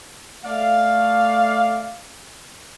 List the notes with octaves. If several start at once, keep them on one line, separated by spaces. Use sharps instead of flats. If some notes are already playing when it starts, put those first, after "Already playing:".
A3 D5 F5